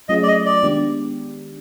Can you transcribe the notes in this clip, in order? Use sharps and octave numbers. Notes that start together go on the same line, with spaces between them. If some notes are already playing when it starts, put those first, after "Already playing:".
F#3 A3 C#4 F4 G#4 D#5
D5
D#5
D5
D#3 G#3 B3 D4 G4